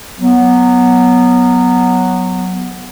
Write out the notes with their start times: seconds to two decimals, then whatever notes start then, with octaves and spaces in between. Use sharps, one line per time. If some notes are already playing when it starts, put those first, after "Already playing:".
0.20 F#3 B3